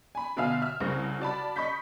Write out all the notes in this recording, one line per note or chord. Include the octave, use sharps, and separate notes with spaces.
G#5 B5
B2 D3 E5 F5 G#5 F6
E5 F6
C2 C#3 C4 A#6
F#4 D5 A5 B5
D#5 B5 C#6 G6 B6